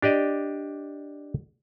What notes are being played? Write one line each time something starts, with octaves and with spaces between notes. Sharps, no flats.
D4 G4 D5 D#5